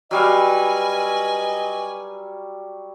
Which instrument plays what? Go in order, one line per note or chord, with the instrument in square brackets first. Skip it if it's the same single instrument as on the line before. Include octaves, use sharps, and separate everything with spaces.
[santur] F#3 G3 F5 [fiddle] B4 G#5 [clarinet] D#5